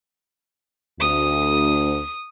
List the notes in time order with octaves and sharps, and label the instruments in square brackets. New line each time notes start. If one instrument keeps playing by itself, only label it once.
[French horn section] D2 [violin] D#6